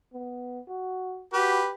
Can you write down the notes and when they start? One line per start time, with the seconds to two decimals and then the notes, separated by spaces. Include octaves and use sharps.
0.13 B3
0.68 F#4
1.33 F#4 G4 B4